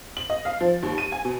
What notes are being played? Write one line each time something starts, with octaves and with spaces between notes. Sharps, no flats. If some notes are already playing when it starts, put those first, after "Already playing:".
F#7
D#5
F5
F3
D#2
D#7
G#5
B2